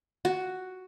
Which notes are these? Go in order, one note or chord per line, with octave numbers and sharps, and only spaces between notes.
F#4